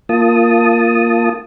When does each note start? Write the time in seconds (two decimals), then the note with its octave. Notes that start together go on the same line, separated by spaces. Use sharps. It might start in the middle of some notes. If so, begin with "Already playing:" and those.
0.09 A#3 F4 A5 D#6